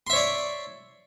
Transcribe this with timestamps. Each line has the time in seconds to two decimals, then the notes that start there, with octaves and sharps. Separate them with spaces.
0.07 C6
0.10 E5
0.13 C#5
0.16 D5